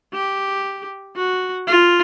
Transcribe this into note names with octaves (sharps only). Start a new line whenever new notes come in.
G4
F#4
F4